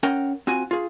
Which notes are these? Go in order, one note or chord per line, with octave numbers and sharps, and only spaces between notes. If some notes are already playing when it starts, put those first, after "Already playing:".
C#4 A#4 F#5 G5
C4 F4 F#4 G#5
F4 G#4